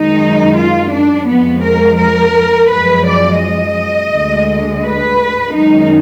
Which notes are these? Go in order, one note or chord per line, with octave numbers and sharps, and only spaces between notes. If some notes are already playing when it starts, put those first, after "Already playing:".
Already playing: F#2 D#3 G#3 D#4
F4
D4
F2 F3 G#3 B3
A#4
A#4
F#2 F3 G#3 B4
D5
D#5
D2 D3 G#3
B4
F#2 D#3 G#3 D#4